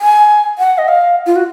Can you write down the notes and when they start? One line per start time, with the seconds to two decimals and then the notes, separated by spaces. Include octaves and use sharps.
0.01 G#5
0.58 F#5
0.78 D#5
0.88 F5
1.26 F4
1.36 F#4